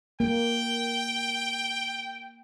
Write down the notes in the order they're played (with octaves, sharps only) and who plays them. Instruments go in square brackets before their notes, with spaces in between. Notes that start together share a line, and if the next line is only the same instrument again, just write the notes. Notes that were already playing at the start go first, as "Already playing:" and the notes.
[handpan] A#3 [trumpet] G5